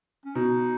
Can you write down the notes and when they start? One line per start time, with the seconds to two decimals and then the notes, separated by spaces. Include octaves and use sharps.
0.25 C#4
0.35 B2 D#4